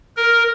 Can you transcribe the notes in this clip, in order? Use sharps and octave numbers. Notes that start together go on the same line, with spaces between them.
A#4